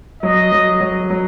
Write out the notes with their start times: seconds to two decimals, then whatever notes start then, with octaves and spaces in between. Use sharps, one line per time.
0.23 F#3 D#5
0.52 F#3
0.81 F#3
1.10 F#3